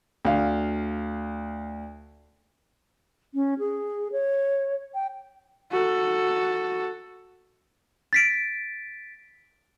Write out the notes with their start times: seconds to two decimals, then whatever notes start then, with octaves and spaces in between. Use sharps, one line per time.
0.25 D2 F5
3.34 C#4
3.59 G#4
4.12 C#5
4.94 G5
5.72 F#4 A4
8.13 A6 B6 D7